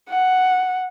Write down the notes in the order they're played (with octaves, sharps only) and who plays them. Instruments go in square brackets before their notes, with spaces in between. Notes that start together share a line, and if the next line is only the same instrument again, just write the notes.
[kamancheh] F#5